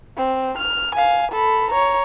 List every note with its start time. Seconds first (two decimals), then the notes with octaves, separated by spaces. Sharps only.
0.17 C4
0.58 F6
0.95 F5 G#5
1.32 A4 B5
1.71 C#5 A#5